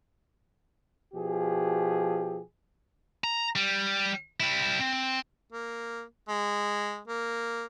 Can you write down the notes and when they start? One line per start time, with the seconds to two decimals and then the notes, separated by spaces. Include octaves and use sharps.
1.14 B2 F3 G4 G#4
3.24 A#5
3.56 G3
4.40 G3 E4
4.79 C4
5.52 A#3
6.29 G#3
7.07 A#3